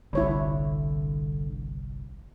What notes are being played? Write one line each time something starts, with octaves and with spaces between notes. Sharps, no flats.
G1 C2 D3 E4 C#5 B5